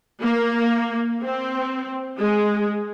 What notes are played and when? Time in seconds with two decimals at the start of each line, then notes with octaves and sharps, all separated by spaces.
0.22 A#3
1.24 C4
2.19 G#3